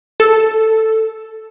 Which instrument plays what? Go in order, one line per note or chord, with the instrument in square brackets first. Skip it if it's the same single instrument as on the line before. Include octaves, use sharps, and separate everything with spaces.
[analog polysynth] A4